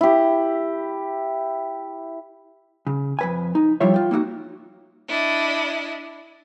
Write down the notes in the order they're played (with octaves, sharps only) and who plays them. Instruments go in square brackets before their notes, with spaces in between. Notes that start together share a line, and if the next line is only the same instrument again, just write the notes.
[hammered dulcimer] E4 G4
[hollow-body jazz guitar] C#3
F2 B4 G#5
D#4
F3 G3 E4 F4 C#5 E5
F4 G5
A#3 D#4 E4 F#4
[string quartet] D4 E4 D#5